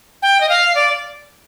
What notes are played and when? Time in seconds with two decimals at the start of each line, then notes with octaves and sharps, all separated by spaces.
0.22 G5
0.41 D#5
0.49 F5
0.75 D5